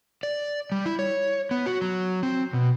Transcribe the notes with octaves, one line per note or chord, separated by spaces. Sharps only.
D5
G3
E4
C#5
B3
F#4
F#3
C4
B2